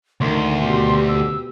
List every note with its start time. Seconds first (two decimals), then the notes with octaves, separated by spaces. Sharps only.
0.21 D2 D3 D#3 C6
0.60 B2 G4
1.08 E6